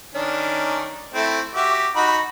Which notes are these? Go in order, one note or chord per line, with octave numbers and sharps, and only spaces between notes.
D#3 C#4 D4
A3 C4 E4
F#4 G4 E5
D#4 F#4 B5